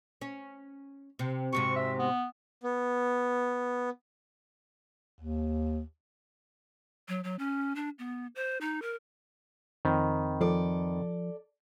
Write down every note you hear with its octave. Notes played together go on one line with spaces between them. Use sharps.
C#4
C3
G#2 C3 F#3 C#6
E5
B3
B3
D#2
F#3
F#3
C#4
D4
B3
C5
D#4
A#4
F2 D#3 C4 B5
F3 A4 D5